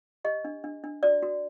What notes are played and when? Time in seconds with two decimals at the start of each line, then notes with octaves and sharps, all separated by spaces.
0.24 G4 D#5
0.45 D4
0.64 D4
0.84 D4
1.03 F#4 D5
1.23 F#4